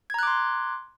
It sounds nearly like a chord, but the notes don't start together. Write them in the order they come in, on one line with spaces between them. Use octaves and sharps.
G#6 A#5 F#6 D6 C6